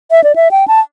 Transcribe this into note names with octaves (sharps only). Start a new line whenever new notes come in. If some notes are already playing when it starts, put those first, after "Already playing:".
E5
D5
E5
G5
A5